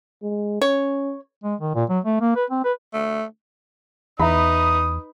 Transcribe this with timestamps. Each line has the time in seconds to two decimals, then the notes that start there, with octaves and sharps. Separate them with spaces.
0.23 G#3
0.62 C#4 C#5
1.44 G#3
1.61 D#3
1.75 A#2
1.90 F#3
2.05 A3
2.21 A#3
2.36 B4
2.50 C4
2.64 B4
2.94 A3
4.20 E2 D#4 B4 E5 A#5 B5 D#6